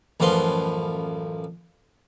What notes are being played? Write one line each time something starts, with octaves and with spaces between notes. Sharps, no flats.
A1 F#2 F3 B4 C6